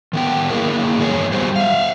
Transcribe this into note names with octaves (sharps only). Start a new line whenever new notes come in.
D#3 B3 G5
A#3 B3 E4 G#4 A#4
E2 G2 D#3 G#4 C#5
F#3 G3 B3 G4 C5
E5 F5